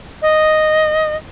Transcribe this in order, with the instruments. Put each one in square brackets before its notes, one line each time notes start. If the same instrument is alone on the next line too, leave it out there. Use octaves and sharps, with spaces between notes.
[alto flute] D#5